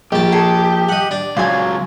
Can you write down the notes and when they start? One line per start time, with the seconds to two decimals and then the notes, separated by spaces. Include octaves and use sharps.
0.12 A#1 G4 A5
0.32 G#4 A4
0.89 D#5 F#5
1.11 D4
1.37 C#2 F#3 F4 G#5